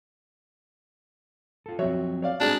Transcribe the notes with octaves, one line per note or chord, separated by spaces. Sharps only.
F4 A4
F3 F#3 C4 F#4 C#5 E5
C#5 D5 F5
G#3 C4 D4 F#4 G#4